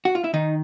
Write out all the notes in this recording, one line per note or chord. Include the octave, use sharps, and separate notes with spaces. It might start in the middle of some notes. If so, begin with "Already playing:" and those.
F#4
F4
E4
D#3 D#4